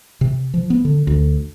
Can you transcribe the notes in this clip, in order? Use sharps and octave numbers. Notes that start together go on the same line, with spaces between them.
C3
F3
B3
D3
D2